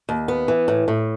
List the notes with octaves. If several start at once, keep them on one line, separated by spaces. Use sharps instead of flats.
D#2
B3
E3
A2
A2